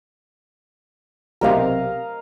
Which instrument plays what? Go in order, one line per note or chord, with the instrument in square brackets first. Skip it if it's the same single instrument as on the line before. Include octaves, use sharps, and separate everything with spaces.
[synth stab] B1 C3 [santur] A#4 D#5 F5